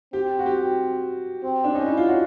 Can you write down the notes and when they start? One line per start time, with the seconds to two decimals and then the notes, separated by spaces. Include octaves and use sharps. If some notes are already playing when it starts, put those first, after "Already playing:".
0.13 C4 G4
0.39 F#4
0.46 G4
1.43 C4
1.64 D4
1.75 C#4 D#4
1.86 E4
1.97 F4
2.07 F#4